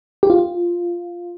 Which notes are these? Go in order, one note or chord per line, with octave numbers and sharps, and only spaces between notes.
G4
F4